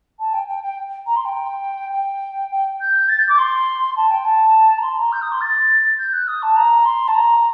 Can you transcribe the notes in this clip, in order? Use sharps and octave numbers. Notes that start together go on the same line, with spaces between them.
A5
G5
G5
G5
A#5
C6
G5
G5
G5
G6
A6
G6
D6
C6
A5
G5
A5
A#5
C6
A#5
G6
D#6
C6
A6
G6
F#6
D#6
A5
A#5
C6
A5
A#5